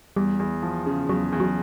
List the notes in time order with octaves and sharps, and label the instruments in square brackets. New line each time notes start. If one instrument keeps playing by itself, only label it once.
[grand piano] E2 [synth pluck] G3
[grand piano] E2
F3
C#3
[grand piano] E2 [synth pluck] F#3
[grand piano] E2
[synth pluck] F#3